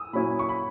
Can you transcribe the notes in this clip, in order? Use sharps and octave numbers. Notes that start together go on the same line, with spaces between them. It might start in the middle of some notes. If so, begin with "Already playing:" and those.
Already playing: D#6 E6
A#2 F#3 C#4 E4 B5
C#6
B5